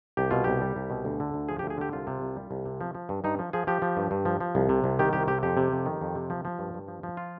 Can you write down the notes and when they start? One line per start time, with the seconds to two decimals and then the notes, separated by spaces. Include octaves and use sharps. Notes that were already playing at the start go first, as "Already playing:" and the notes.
0.17 C2 G4
0.31 B2 F4
0.44 C2 G4
0.61 G3
0.76 C2
0.90 B2
1.05 D2
1.20 D3
1.34 D2
1.49 F3 G#4
1.59 G4
1.63 D2
1.70 G#4
1.77 D3 G4
1.93 C2 F4
2.07 C3
2.22 C2
2.36 G3
2.51 C2
2.65 C3
2.81 F3
2.95 F3
3.09 G2
3.24 G2 D#4
3.39 F3
3.53 F3 G#4
3.67 F3 G4
3.82 F3
3.97 G2
4.11 G2
4.25 F3
4.40 F3
4.55 C2
4.69 C3
4.84 C2
4.99 D#3 G4
5.13 C2 G4
5.28 C3 G4
5.43 F2 G4
5.57 C3
5.72 F2
5.86 D#3
6.01 F2
6.15 C3
6.30 F3
6.45 F3
6.59 G2
6.74 G2
6.88 F3
7.03 F3
7.17 F4